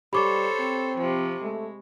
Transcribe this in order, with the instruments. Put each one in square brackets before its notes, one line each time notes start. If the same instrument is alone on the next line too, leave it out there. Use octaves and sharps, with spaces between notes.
[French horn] G3 [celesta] G4 D6 [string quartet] A4 C5 C#5 [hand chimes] B5 C#6
[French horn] C4
[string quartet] C3 F3
[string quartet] G#3 [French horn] A3